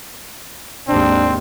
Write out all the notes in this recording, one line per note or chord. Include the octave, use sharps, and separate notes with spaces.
G#1 D#2 C4 D4